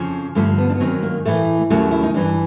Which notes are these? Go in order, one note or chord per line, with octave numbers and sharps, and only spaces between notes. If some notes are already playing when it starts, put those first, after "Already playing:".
Already playing: F2 C#3 F3
G2 D3 F3 A3
B3
D4
B3
F#2 D#3 F#3 C4
A#3
A2 E3 A3
D#2 C#3 F#3 A3
E4
D#4
G2 E3 D4